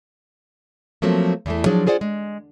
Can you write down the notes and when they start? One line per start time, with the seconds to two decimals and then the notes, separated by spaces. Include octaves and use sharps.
1.02 F3 F#3 A3 A#3 C4
1.46 E2 E3 A3
1.66 F3 F#3 D4 G#4
1.87 F4 G#4 C5 D5 F#5
2.01 G#3